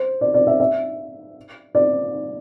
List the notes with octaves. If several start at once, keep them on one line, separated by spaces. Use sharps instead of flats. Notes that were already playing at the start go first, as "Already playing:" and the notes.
Already playing: C5
D5
D5
E5
E5
D5